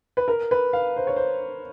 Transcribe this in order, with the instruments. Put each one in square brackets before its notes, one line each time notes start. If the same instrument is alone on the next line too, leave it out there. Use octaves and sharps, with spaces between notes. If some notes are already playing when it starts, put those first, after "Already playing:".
[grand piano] B4
A#4
B4
F5
C5
C#5
C5